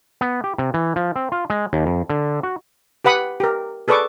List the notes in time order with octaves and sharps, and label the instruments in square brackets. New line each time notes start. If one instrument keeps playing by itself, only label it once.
[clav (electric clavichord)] B3
G4
C3
E3
F3
C4
F4
G#3
D#2
F2
D3
F#4
[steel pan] G4 B4 F#5 B5 D#6
G4 A#4
G#4 A4 B4 D5 C#6 D6